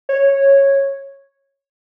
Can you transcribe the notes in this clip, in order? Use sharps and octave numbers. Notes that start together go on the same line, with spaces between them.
C#5